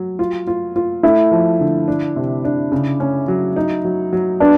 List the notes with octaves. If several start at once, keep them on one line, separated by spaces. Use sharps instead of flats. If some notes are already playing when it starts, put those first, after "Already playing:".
Already playing: F#3
F4
F4
F4
A3 E4
F3
D3
D4
C3
D4
C#3
C#4
F#3
D#4
F#3
F#3
B3 D4